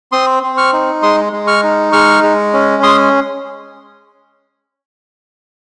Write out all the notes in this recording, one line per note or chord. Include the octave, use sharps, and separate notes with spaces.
C4 C6 D#6
C4
C#6 F6
D#4
G#3 C6 D#6
G#3
C#6 F6
D#4
G#3 C#6 F6
G#3
C#4
G#3 C6 D#6